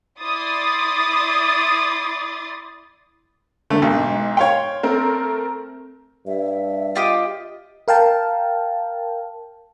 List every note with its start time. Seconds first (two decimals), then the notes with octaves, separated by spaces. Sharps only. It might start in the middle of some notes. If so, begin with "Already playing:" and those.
0.21 E4 D5 C6 D#6 A6
3.70 D3 A3 A#3
3.82 B1 G#2
4.37 C#5 F5 G5 C6
4.83 A3 C4 A#4
6.27 G2 E5
6.96 F4 G4 D#5
7.88 A#4 F5 G5 A5